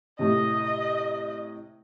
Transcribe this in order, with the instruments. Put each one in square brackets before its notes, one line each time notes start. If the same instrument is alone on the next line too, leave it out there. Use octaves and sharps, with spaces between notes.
[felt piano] A2 C3 [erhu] D#5